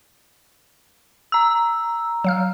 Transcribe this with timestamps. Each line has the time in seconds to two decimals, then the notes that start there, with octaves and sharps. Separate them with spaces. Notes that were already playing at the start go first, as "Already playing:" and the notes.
1.32 A#5 E6
2.24 F#3 F5 F6